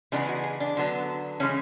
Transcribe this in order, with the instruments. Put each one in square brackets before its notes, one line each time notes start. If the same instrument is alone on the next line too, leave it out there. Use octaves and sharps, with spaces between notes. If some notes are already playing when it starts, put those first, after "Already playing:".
[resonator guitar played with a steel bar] C#3 E3 G#3 B3 D4
F#4
G#4
D4
D3 F#3 B3
C#3 E3 G#3 C#4